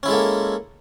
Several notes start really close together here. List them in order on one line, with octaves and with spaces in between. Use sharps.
C#4 E4 G#3 A4 A#3